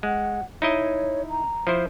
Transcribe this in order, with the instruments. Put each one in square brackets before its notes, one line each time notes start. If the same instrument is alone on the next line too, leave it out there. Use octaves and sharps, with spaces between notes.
[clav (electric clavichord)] G#3 [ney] F#5
[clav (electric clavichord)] D#4 E4 D#5 [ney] C#5
[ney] A#5
[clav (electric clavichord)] F3 E4 C5